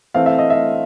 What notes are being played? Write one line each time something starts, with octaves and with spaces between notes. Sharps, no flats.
E3 A3 C4 F5
E5
D#5
E5